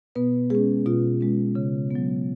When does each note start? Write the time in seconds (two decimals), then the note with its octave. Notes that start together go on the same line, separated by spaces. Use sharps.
0.16 B2 B3 B4
0.50 G#3 C#4 G#4
0.86 B2 F4
1.21 G#3 C#4
1.55 C#3
1.91 F#3 B3